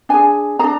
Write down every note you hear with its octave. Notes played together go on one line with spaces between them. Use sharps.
D4 G#4 G#5
D4 G#4 A#5